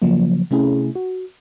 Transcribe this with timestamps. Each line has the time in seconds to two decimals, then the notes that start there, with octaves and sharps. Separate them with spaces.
0.02 C#3 F3 F#3 A#3
0.51 C3 A3 C#4 E4 G#4
0.95 F#4